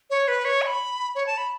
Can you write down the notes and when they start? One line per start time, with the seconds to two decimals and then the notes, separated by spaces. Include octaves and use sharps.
0.10 C#5
0.28 B4
0.45 C#5
0.62 C#6
0.67 B5
1.15 C#5
1.27 A5
1.38 B5